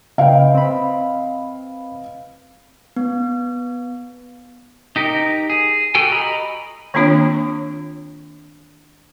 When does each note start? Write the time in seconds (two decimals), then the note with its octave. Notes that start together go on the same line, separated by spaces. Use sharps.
0.18 C#3 B4 D#5 F5 G5
0.55 C4 B5
2.97 B3
4.96 D#4 G4 A#4
5.50 G#4
5.95 F#4 G4 A4 G5 G#5
6.12 D#5 A#5 B5
6.94 D#3 A#3 C4 D4 F4 C#5